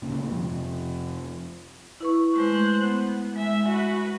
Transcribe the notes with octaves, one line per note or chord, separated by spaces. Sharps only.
D2 A#2 C#3
F2 C3
E4 B4 C#6
G#3 A3 C5 F#6
B3
G#3 E5 G#5
F#4 B4